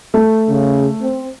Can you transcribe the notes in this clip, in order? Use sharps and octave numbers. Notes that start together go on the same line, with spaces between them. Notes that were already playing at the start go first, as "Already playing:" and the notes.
A3
C#3
C4